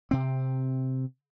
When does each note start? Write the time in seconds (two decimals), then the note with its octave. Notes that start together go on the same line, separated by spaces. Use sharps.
0.11 C3 C4